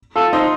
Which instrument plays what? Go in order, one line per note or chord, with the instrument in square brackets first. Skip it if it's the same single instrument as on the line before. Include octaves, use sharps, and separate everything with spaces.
[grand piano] F4 [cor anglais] A4
[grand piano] D#4 [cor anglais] C5